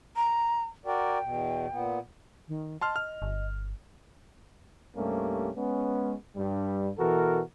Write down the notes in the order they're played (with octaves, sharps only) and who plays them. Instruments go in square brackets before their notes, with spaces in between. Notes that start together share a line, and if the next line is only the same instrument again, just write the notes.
[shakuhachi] A#5
[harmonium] F#4 A#4 D5 [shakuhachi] G5
[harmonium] E2 B2
A#2 B3
[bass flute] D#3
[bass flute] D#5 [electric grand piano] A5 C6 F6
[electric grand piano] F6
[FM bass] G1
[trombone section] C2 G2 A3 A#3 C#4 G4
G#3 B3 C#4
G2 G3
B2 E3 F#4 A4 A#4